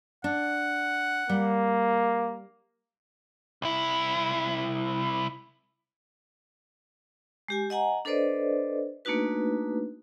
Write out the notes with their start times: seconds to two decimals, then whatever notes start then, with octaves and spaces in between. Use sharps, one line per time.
0.24 D4 F#5
1.29 G3 A#3
3.62 C2 E4
7.48 G#3 G4 G#5
7.70 D#5 F#5 G#5 A#5
8.05 D4 A4 B4 C5 D5 D#5
9.05 A3 A#3 D4 D#4 F#4 B4